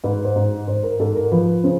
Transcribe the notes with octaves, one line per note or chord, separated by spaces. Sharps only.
G#2 B4
C5
G#2
G#2 C5
A#4
G#2 A4
A#4
F3 B4
C#3 C5